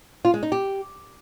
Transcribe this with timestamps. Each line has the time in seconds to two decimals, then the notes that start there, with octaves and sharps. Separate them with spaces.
0.25 F4
0.34 G#3
0.43 D#4
0.52 G4